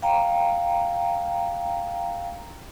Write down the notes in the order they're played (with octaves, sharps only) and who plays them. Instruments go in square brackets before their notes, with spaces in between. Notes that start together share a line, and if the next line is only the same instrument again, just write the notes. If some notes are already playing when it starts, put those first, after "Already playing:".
[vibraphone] F5 G5 A#5